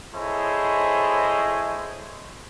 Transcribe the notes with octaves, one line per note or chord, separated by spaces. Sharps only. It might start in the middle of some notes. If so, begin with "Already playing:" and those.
E4 G#4 A4 C5 C#5 D#5